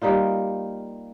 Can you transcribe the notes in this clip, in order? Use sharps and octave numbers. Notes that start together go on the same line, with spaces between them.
G3 A#3 D#4 F4